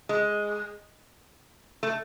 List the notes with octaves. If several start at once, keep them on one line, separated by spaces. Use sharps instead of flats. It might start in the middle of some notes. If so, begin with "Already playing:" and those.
G#3
A3